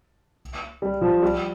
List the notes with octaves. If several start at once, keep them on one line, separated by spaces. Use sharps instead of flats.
G3
F3
G3